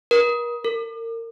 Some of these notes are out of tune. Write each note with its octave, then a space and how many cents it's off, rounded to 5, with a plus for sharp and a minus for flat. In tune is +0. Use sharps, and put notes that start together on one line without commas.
A#4 +40
A#4 -35